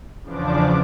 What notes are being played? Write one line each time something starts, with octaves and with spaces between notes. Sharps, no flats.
E2 C#3 F3 D4 D6